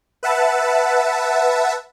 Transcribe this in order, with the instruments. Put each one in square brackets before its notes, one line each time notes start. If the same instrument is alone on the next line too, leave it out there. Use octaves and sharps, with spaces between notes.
[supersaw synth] B4 E5 F#5 A5